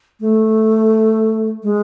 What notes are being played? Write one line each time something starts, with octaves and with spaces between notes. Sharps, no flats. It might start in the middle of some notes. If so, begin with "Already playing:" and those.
A3
G#3